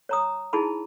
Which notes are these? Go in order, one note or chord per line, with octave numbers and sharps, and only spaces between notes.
C#5 A#5 D#6
D#4 E4 G#4 A5 B5